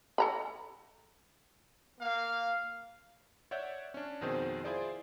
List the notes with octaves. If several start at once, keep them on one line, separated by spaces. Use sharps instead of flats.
A4 A#5 B5
A#3 F5
C#5 D5 E5 F#5 G6
C#4 D4
F2 B2 D#3 C4 G#4 C5
E4 F4 G#4 C5 D5